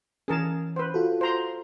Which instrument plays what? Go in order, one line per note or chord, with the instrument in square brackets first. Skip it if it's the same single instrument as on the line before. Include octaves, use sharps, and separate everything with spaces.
[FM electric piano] E3 C#4 [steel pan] G#4 A#4 A5
[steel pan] B4 C5
[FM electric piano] F4 F#4 A4
[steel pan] C5 A#5 C6